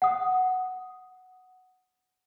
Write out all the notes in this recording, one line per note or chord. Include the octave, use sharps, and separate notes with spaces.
F#5 D#6